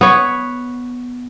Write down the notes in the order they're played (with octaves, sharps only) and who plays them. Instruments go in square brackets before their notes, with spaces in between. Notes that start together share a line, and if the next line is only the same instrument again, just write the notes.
[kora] B3 C#5